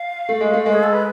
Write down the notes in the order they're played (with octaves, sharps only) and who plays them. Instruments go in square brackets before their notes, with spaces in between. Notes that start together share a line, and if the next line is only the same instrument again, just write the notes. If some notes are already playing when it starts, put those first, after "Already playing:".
Already playing: [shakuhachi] F5
[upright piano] A3
G#3
A3
G#3
[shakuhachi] G#4
A4
B4